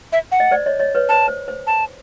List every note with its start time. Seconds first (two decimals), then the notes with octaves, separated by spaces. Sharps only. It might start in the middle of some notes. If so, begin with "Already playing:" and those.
0.12 E5
0.32 F#5
0.40 D#5
0.51 C5 D5
0.66 C#5 D#5
0.80 C#5 D#5
0.95 B4 C#5
1.09 C5 A5
1.28 C5
1.48 C5
1.67 A5